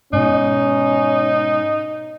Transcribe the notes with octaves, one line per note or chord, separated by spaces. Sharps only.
G#2 B2 C#4 D#4